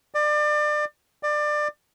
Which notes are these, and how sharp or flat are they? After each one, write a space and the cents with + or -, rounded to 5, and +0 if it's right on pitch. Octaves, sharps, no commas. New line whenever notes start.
D5 +30
D5 +25